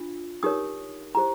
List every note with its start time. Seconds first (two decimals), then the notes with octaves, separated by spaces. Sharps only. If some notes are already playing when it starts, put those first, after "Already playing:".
Already playing: D4 F4
0.43 D#4 G4 A#4 C#5 D#6
1.15 E4 G4 C5 A#5